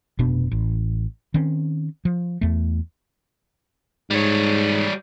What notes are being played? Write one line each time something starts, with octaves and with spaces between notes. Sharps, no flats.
F1 B2 B3 D4
A1
D#3 C4 C#4
F3
E2 A3
G#2 G3 C#5